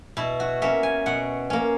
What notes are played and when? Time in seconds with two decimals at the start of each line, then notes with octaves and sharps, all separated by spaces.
0.17 B2 E4
0.40 F#4
0.62 A#3 C#4 E5
0.83 G#5
1.06 B2 F#5
1.50 A#3 C#4